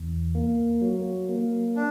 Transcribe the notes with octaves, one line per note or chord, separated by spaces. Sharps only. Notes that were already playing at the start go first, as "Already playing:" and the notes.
Already playing: E2
A#3
F#3
A#3
D4